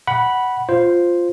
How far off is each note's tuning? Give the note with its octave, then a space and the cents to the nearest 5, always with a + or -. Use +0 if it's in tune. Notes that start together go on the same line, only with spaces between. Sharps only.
F#5 +10 B5 -10
F4 +0 C5 +0